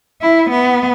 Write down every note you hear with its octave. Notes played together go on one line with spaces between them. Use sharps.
E4
B3